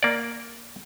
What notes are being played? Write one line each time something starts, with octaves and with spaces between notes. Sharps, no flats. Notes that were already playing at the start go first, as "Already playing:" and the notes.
A#3 D5